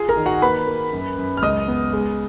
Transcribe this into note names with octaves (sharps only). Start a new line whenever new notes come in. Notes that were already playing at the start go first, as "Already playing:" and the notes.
Already playing: F4 G#4 G#5
A#4 A#5
D#3
F#4 F#5
A#3 B4 B5
A#3
F#2
F#2
F6
C#2 D#5 D#6
B3
G#3